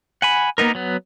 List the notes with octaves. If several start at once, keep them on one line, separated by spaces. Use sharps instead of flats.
F#5 G#5 B5
A#3 B3 D#4 A#4
F#3 B3